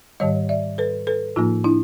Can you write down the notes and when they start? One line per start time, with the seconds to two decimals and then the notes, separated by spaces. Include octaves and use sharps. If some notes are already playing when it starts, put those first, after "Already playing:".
0.20 G#2 D#3 G3 C#5 D#5
0.49 D5 E5
0.78 A4 B4
1.07 A4 B4
1.36 A2 F3 A#3 D#4 F4
1.64 D4 E4